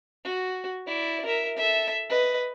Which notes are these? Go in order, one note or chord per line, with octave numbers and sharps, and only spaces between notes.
F#4
E4 D5
A#4 E5
A4 E5
B4 D#5